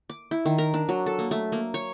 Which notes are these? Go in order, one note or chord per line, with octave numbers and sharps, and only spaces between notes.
D6
E4
D#3
A#4
D4
F#3
A4
A#3
A3
A#3
C#5